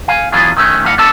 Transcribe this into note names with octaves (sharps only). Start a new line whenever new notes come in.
F5 G#5
E3 F#3 B3 D4 F4 G#4
D#3 A3 C#4
F2 A2 D4 F5 F#5
B3 D4 A4 A5